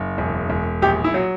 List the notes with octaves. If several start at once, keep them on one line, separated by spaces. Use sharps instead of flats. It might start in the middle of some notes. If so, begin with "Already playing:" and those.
Already playing: F#1
E1
E1
A#1 G4
E4
F#3